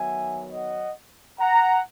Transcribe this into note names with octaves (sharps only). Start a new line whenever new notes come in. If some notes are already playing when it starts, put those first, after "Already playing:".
Already playing: D#3 F#3 B3 E5 G#5
D#5 F#5
F#5 A#5